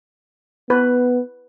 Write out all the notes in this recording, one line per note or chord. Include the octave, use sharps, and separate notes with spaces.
B3 B4